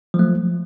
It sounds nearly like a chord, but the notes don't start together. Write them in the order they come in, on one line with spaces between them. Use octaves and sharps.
F3 F#3 A3